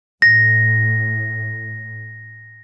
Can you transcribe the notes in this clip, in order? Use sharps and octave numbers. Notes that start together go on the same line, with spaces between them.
A2 A#6